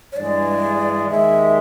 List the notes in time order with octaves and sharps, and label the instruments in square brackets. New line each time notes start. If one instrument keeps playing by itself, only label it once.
[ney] C#5
[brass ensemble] G2 E3 G#3 [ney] D5
[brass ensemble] D#2 D#3 G#3 [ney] E5